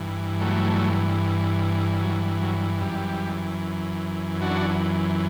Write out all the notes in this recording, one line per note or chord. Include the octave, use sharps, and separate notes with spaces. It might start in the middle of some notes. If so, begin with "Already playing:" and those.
Already playing: G2 E3
F#3 A3
F#3
F#3
F#2 E3 G3
D4 F#4